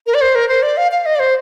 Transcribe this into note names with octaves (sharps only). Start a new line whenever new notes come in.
A#4
D5
C5
A#4
C5
D5
F5
F5
D#5
D5
C5